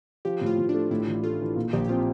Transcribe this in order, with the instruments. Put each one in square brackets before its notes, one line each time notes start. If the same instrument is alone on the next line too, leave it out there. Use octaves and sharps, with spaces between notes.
[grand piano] F3 [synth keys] G4
[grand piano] A2
[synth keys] F4
[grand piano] A2
[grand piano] A3 [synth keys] D4
[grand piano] A2 [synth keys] E4
[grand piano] A1
[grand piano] A3 [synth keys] F4
[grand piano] E3
A#2
[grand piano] A#1 [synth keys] G4
[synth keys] G4
[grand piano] C4 [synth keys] F4